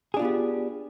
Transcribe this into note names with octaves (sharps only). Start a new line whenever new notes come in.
B3 D4 F4 G4 G#4